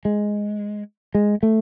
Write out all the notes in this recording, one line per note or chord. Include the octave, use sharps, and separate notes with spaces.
G#3
G#3
A3